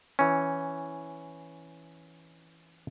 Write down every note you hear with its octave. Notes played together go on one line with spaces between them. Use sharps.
E3 C#4